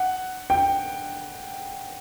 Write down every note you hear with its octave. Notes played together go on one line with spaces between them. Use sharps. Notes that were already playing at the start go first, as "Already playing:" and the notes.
Already playing: F#5
G5